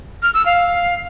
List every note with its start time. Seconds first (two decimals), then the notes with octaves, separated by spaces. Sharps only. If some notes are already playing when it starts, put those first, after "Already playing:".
0.23 F6
0.34 E6
0.46 F5